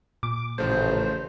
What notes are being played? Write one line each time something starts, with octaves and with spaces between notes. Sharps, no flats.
A#2 D6
A1 C#3 F3 A3 C5